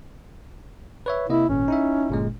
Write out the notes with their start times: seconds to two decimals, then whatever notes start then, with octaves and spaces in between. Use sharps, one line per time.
1.06 B4 C#5 E5
1.29 C3 A#3 E4 D#5
1.49 G#1 A#2 C#4
1.68 D#4 E4 E5
2.10 G1 A#2 G#3